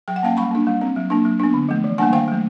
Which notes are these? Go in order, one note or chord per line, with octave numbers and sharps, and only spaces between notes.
F#3 G5
F#5
A#3 C#4 F5 G5
G3 B5 C#6
A#3 D4
G3
C4
F#3
A#3 D4
F#3
B3 D4
D3
F3 A3
E3
G3 A#3 D4 F#5 G#5
D#3 F5 G5
F#3 A3